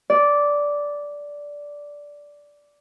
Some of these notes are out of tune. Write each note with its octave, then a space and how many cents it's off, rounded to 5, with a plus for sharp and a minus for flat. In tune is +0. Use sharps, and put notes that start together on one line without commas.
D5 -10